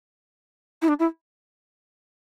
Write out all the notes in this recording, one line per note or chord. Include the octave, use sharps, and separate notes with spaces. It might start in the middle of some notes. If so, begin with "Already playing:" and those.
E4
D4
E4